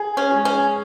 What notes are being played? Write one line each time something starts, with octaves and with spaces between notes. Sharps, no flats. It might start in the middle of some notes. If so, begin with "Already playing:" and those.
Already playing: G#4
C#4
G#3
C#4